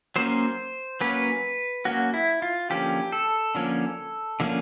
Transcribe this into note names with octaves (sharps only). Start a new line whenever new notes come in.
F#3 A#3 C#4 C5
F#3 A#3 C#4 B4
F#3 A#3 C#4 F#4
E4
F4
D3 F3 A#3 C#4 G4
A4
D3 F3 A#3 C#4
D3 F3 A#3 C#4